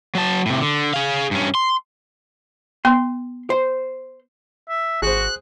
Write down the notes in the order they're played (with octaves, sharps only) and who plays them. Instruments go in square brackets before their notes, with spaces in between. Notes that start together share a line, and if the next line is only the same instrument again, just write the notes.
[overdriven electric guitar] F#3 A5
A2 C3
D3
G#4 F5
G2 C#4
C6
[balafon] B3 [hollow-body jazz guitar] C6
[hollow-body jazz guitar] C5
[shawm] E5
[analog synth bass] G#1 [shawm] F#4 [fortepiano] G#4 C5 [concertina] F#6